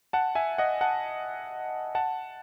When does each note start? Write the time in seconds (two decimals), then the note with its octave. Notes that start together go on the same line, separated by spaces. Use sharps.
0.13 F#5 A5
0.35 E5 G#5
0.58 D#5 F#5
0.81 F#5 A5
1.95 F#5 A5